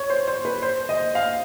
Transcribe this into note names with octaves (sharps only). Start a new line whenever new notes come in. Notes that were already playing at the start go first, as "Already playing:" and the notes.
Already playing: C#5
C5
C5
B4
C5
D#5
F5